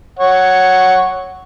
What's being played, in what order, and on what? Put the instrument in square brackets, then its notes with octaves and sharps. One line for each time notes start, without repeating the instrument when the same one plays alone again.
[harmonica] C#5 F#5